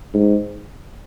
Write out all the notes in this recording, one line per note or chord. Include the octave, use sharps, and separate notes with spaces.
G#2